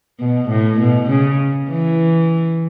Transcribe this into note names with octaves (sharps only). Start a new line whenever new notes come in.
B2
A2
B2
C#3
E3